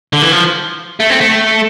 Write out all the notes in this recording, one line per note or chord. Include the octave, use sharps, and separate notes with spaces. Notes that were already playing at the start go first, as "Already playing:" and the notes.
D3
E3
F3
A3
C4
A3